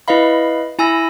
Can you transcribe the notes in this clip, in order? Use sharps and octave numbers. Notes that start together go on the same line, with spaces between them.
E4 B4 D#5 F5 B5
E4 G#5 B5 E6 A#6